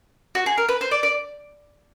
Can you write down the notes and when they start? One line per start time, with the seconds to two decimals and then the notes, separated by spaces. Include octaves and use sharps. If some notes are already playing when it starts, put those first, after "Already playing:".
0.35 F#4
0.46 G#4
0.58 A#4
0.69 B4
0.81 C5
0.91 D5
1.03 D5